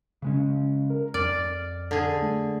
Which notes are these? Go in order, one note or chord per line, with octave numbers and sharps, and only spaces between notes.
C#3 G#3 C#4
A#4
F2 D5 F6
D3 G#4
A3